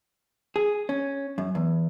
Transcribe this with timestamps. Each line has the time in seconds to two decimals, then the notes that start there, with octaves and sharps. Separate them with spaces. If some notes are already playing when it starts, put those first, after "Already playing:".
0.56 G#4
0.89 C#4
1.38 F#2
1.55 E2